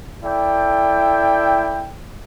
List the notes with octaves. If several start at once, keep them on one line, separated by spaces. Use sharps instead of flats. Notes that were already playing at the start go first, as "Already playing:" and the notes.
E4 A4 D5 G5